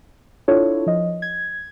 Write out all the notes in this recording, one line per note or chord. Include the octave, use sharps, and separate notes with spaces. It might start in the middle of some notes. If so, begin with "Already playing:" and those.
D4 E4 F4 A4 C#5
F3 D#5
G#6